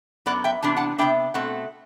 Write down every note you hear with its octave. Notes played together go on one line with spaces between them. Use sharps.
F#2 F#3 B3 D5 F#5
E5 G5
C3 E3 B3 D4 A5
F#5 A5
C3 E3 B3 D4 E5 G5
B2 A3 C4 F#5